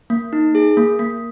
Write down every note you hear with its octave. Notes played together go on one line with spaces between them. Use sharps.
A#3
D#4
G#4
A#3
A#3